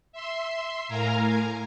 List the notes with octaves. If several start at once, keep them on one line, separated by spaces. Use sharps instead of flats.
E5 C6
A2 A#4 F5 G#5 A#5